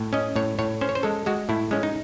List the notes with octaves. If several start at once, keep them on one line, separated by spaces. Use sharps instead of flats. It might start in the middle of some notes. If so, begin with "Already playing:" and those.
Already playing: A2
C#4 D#5
A2 C#5
A2 C#5
C#4 C5
C#5
C5
G#3 A4
G#3 F#4
A2 E4
G#3 C#4
D#4